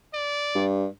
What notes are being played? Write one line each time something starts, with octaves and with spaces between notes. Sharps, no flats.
D5
G2